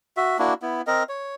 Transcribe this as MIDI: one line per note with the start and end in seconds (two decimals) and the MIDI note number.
0.17 0.38 66
0.17 0.38 76
0.39 0.54 58
0.39 0.54 62
0.39 0.54 64
0.39 0.54 66
0.62 0.82 59
0.62 0.82 64
0.87 1.03 60
0.87 1.03 70
0.87 1.03 75
1.09 1.35 73